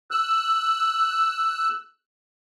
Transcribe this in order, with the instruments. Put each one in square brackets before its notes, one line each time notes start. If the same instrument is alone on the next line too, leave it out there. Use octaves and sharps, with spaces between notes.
[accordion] E6 F#6